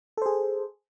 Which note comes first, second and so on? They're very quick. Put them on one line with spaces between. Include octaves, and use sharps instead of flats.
A4 C5 G#4